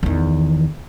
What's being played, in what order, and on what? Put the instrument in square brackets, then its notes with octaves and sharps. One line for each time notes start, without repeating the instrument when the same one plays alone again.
[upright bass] E2 D#3